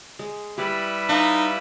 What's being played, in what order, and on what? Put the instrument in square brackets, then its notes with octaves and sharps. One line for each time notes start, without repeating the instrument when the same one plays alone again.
[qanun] G#3
[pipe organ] G3 E4 B4 [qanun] G4 D5
[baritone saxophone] D#4 [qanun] A4 F5 C#6